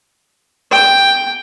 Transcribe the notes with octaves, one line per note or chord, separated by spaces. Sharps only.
G5